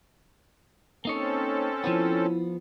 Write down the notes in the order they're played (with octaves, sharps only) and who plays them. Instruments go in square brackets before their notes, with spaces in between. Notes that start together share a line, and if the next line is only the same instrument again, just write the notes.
[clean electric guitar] A#3 D#4 C#5 [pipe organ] C4 C#4 A4
[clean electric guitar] F3 B3 [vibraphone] E4